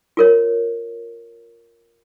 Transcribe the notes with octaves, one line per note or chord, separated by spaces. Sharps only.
F4 A#4 C#5